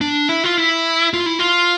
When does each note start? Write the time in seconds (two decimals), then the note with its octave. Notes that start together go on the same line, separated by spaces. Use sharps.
0.01 D4
0.29 E4
0.44 F4
0.57 E4
1.14 F4
1.26 E4
1.39 F4